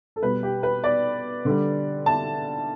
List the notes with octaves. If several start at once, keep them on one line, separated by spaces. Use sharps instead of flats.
A4
B2 G3 B4
G4
B4
D5
D3 G3
A5